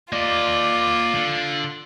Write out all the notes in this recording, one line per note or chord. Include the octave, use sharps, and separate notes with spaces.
A#3 F4 D5 D#5
D3